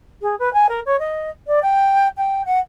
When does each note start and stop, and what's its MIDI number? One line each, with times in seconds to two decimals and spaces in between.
0.21 0.35 68
0.39 0.51 71
0.53 0.66 80
0.68 0.80 70
0.85 0.96 73
0.99 1.29 75
1.47 1.59 74
1.62 2.07 79
2.17 2.42 79
2.45 2.58 78